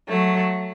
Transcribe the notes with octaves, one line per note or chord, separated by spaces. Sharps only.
F#3 A3